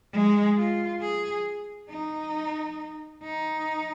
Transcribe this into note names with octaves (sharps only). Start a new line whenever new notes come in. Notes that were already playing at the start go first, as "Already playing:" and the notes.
G#3
F4
G#4
D#4
D#4